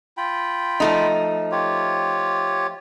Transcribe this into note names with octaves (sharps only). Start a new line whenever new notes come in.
F4 G5 B5
F3 A3 D#4
F4 G4 C#5